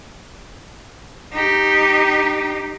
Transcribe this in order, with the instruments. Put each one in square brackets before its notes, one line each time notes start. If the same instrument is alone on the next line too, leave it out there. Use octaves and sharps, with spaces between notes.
[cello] D#4 G4